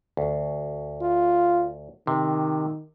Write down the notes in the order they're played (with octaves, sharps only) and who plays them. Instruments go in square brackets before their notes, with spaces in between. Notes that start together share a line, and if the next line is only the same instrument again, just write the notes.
[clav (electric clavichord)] D2
[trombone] F4
[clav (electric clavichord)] C3 [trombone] D#3